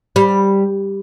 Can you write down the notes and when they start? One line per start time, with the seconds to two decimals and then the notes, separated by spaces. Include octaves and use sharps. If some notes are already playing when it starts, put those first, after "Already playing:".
0.16 G3